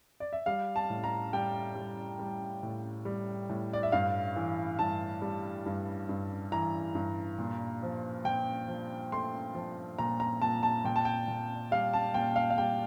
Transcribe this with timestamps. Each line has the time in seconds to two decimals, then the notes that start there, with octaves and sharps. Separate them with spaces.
0.20 D5
0.33 E5
0.46 G3 F5
0.76 A5
0.90 A2
1.04 A#5
1.33 G3 G5
1.75 G3
2.19 G3
2.63 A2
3.05 G3
3.49 A2
3.73 D5
3.83 E5
3.92 G2 F5
4.36 E3
4.79 G2 A5
5.22 G3
5.66 G2
6.09 G2
6.52 E3 A#5
6.95 G2
7.38 A#2
7.83 F3
8.25 A#2 G5
8.68 F3
9.12 A3 C6
9.54 F3
9.99 A#2 A#5
10.20 A#5
10.42 A#2 A5
10.63 A5
10.85 A#2 G5
10.96 A5
11.05 G5
11.28 A#2
11.71 G3 F5
11.93 A5
12.14 A#2 G5
12.36 F5
12.50 F5
12.58 G3 G5